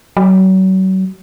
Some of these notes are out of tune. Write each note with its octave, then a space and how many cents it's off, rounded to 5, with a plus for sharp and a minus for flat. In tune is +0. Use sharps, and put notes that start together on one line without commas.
F#3 +35